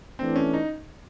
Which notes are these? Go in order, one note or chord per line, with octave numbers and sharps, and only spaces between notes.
E3 A3 C4 D4
C#4
D#4